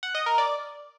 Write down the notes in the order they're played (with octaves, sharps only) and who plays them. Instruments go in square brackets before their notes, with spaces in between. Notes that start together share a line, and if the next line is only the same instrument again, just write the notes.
[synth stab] F#5
D#5
A#4
D5